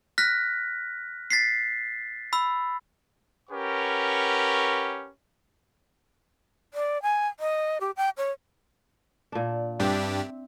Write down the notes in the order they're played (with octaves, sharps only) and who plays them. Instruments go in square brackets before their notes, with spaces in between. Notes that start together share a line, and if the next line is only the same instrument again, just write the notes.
[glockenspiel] F6 F#6 A#6 B6
A6 B6 C7
B5 E6
[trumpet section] C#4 G4 A#4 B4 F#5 C#6
[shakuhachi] D5
G#5
D#5
G4
G5
C#5
[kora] A#2 D4
[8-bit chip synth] G2 D4 G4 [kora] C4 C5 E5